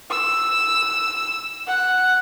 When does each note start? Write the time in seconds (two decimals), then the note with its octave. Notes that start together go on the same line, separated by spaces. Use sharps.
0.11 E6
1.67 F#5